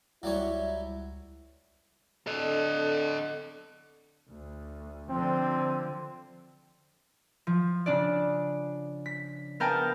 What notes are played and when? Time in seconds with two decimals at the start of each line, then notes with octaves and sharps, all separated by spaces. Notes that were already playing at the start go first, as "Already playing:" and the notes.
0.23 C#2 F#3 G3 E4 C#5
2.27 D3 A4 D#5
4.30 D2
5.10 D3 F3 C4
7.47 F3
7.86 C#3 D4 D5
9.06 B6
9.60 B3 G#4 A#4 F5 G5 A5